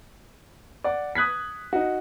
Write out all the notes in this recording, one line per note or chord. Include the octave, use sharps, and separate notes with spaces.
D5 F#5
D#6 F#6 G#6 B6
D#4 F#4